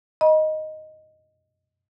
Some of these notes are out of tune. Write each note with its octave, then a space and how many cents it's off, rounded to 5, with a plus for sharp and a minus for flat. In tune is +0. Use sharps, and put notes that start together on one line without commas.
D#5 +0 B5 -40